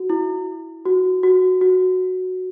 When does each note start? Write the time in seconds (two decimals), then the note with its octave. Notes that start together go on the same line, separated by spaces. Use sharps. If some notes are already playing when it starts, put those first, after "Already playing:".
Already playing: F#4
0.10 E4
0.86 F#4
1.23 F#4
1.61 F#4